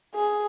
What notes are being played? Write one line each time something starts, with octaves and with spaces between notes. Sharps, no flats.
G#4